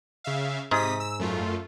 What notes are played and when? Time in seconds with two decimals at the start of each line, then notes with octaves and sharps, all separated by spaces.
0.24 C#3 E5 F5
0.71 G#2 C3 D#6 B6
1.00 E6
1.19 F#2 A3 F4